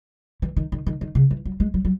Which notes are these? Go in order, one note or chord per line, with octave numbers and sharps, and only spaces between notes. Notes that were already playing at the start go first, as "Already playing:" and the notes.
E3
D#3
D#3
D#3
D#3
C#3
E3
F#3
G#3
F#3
F#3